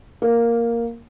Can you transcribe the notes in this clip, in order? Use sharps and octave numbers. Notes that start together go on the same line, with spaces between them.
A#3